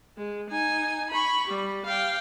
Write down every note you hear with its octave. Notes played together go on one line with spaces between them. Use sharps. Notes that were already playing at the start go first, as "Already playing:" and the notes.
G#3
D#4 G#5
B5 C#6
G3
F5 G5